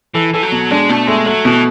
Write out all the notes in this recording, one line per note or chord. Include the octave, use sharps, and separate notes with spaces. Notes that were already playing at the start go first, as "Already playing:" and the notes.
E3 A4
E3 A4
F#3
B2
G#3 D4
B2 A3
G#3 A3
F#3 A3
B2 E3